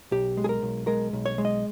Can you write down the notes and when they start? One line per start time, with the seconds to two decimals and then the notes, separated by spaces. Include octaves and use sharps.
0.11 B1 G4
0.37 G#3
0.44 G#4
0.49 A#4
0.63 B1
0.87 G#3 A#4
1.13 B1
1.26 C#5
1.38 G#3
1.45 D#5